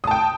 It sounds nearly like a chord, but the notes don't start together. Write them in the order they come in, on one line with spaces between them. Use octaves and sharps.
D#6 A5 G5